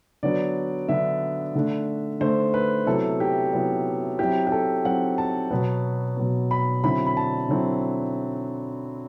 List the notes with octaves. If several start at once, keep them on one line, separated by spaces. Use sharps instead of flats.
D3 F#3 B3 D4 D5
D3 F#3 B3 D4 E5
D3 A3 D4
D3 A3 D4 C5
B4
C3 F#3 B3 E4 A4
G4
C3 F#3 B3 E4
F#3 C4 E4 G4
G4
A4
F#3 C4 E4 F#5
A5
B2 F#3 B3
B2 F#3 B3
B5
D3 F#3 C4 E4 B5
B5
A5
D3 F#3 C4 E4